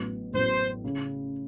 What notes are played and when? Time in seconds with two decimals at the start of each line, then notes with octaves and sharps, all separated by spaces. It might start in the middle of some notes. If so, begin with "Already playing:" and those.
Already playing: A1 A2 F#3 B3
0.33 A1 A2 F#3 B3 C5
0.84 C#3